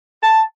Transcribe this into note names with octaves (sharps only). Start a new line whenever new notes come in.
A5